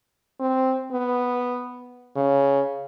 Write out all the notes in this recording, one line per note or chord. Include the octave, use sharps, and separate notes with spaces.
C4
B3
C#3